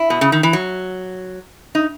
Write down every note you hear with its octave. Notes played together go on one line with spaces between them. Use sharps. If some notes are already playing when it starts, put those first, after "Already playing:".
Already playing: E4
B2
C#3
D#3
E3
F#3
D#4